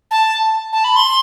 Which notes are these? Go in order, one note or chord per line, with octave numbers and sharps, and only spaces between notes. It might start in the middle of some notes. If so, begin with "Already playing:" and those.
A5
A5
B5
C6